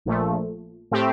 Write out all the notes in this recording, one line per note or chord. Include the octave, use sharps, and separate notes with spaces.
A#1 A#2 F3 A3
A2 A3 C4 G4